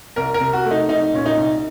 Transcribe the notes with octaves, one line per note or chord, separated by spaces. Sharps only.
C2 A#4
A#4
C3
F#4
A3
D#4
C2 D#4
A#2 C#4
D#4
C2